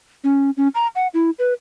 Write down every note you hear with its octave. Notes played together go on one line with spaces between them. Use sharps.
C#4
C#4
A#5
F#5
E4
B4